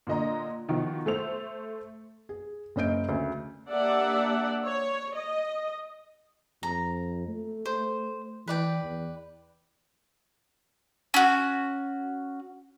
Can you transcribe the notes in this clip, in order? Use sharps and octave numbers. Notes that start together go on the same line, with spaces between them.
A#2 D3 D#5 A#5
B2 D#3 F3 D#4
A3 A4 C5 F7
G#4
F#1 C#4 D#5 G6 D7
D2 C#3
A#3 D4 G4 D5 E5 F#5
C#5
D#5
F2 A#5
A3
C5
E3 B4 D5 G5
E2
C#4 F#4